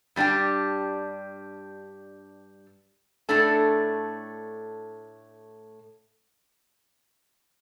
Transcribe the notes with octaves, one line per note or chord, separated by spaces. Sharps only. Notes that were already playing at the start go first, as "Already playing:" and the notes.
G2 G3 D4 G4
A2 A3 D4 A4